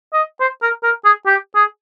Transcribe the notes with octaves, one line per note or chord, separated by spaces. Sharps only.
D#5
C5
A#4
A#4
G#4
G4
G#4